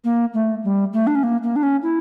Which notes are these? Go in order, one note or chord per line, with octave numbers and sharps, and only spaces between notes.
A#3
A3
G3
A3
D4
C#4
A#3
A#3
D4
C#4
E4